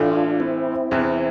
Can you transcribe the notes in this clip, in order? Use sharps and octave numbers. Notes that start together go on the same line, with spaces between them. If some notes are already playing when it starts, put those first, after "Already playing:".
Already playing: A2 E3 A3 D4 F4
C4 E4
E2 C3 E3